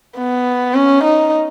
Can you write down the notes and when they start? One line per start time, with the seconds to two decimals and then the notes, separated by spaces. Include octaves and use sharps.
0.18 B3
0.74 C#4
1.04 D#4